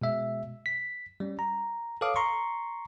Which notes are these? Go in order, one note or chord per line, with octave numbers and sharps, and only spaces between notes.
B2 G#3 E5
B6
G3 C#4
A#5
A4 B4 C#5 F5 D6 D#6
A#5 C6 C#6